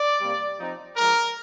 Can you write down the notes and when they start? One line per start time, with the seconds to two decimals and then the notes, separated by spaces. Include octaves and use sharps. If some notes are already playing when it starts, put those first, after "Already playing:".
Already playing: D5
0.18 C3 G3 A#3
0.57 F3 C4 D#4
0.96 F3 G#3 D4 A#4